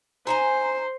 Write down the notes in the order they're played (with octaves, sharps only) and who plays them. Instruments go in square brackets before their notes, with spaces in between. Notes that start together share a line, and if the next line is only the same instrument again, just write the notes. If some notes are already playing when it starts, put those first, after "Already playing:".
[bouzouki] D#4 G#5 A#5 [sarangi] C5